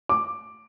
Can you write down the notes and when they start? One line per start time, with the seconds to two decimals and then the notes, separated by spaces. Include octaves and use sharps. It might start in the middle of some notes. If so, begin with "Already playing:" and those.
0.09 D6